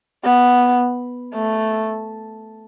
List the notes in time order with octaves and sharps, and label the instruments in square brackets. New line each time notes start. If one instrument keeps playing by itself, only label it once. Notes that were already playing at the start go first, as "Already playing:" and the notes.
[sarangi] B3
A3